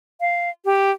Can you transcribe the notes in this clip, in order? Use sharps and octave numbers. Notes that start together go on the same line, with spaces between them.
F5
G4